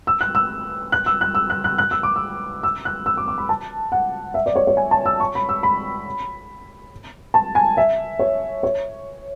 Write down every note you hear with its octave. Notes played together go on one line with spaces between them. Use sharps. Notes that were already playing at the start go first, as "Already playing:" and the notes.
E6
F#6
E6
F#6
E6
F#6
E6
F#6
F#6
F#6
E6
D6
E6
E6
F#6
E6
D6
D6
B5
A5
F#5
E5
D5
C#5
C#5
G#5
A5
E6
C#6
B5
E6
B5
A5
G#5
E5
C#5
C#5